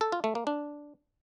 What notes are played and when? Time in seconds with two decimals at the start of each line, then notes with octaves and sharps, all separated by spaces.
0.01 A4
0.12 F4
0.24 A3
0.35 A#3
0.47 D4